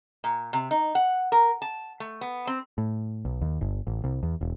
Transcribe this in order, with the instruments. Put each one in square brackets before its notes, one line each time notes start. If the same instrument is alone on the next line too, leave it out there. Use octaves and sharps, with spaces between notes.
[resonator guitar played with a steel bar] A#2
C3
D#4
F#5
A#4
A5
A3
B3
C4
[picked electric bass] A2
B1
D#2
G1
A1
C2
E2
E1